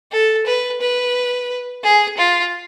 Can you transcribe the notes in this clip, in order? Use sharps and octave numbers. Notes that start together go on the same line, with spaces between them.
A4
B4
B4
G#4
F4